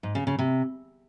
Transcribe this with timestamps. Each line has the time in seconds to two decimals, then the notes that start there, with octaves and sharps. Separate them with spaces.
0.03 G#2
0.15 C#3
0.27 C#3
0.39 C3